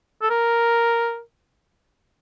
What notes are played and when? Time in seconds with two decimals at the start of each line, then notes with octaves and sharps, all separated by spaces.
0.22 A4
0.30 A#4